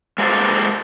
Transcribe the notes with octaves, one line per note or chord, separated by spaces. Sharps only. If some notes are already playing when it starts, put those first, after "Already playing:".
G#3 A#3 G4 A4 C5